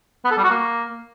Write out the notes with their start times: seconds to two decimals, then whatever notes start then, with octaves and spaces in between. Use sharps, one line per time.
0.24 B3
0.31 A4
0.37 G3
0.44 F#4
0.50 A#3